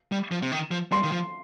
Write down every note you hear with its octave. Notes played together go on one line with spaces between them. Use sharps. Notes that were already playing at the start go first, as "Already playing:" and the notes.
G3
F3
C3
D#3
F3
G3 C6
D#3
F3